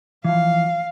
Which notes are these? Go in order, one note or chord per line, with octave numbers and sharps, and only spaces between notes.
E3 F3 F5